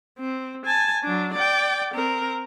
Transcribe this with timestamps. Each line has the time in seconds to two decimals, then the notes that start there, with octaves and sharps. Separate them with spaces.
0.19 C4
0.65 G#5 A5
1.03 F#3 D4
1.34 D5 G5
1.94 C4 A#4